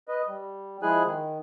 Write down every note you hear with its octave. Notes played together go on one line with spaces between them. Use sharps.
B4 D#5
G3
F3 G#3 E4 G#4 G#5 F#6
D#3